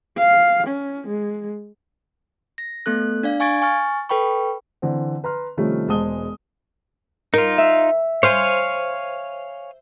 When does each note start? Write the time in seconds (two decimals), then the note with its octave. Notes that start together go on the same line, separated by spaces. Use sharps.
0.18 F5
0.67 C#4
1.08 G#3
2.58 A#6
2.86 A3 B3 A4 F#6
3.23 D4 D5 F5
3.40 F5 G#5 C#6 G#6 A6 D7
3.62 G#5 C#6 F6 A6
4.09 A4 B4 G5 B5 C#6
4.82 D3 E3 C4
5.24 B4 A#5 C6 F6
5.57 C3 D#3 F3 G3 A3 C#4
5.88 E1 G#3 C5 A5 D#6 G7
7.34 D#4 F4 A#4
7.58 E5
8.23 C5 C#5 F5 G#5